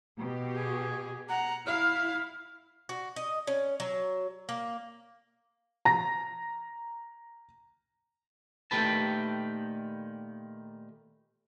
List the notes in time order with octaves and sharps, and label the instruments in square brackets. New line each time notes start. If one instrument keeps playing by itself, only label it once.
[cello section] B2 G4
[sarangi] G#4
[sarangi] F#5 [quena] A#5
[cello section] E4 [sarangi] F5 [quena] F6
[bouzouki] F#4
D#5
C#4
F#3
A#3
[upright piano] A#5 A#6
[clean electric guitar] A#2 D#3 A3 G4 B4 A5